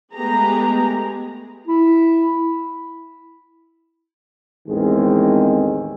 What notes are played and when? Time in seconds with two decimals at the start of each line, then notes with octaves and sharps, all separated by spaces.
0.14 G#3 A3 B3 G4 G#4 A#5
1.68 E4
4.68 A1 E2 D#3 G#3 C4 G#4